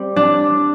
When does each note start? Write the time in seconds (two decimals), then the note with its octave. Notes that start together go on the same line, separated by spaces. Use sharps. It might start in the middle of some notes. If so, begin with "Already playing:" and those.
Already playing: G3 C4
0.16 D4